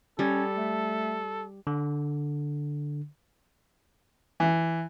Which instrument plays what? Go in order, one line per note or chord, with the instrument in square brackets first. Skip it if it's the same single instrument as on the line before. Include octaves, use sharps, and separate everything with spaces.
[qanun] G3 [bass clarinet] C#4 [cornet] A4
[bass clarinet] A3
[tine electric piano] D3
[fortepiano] E3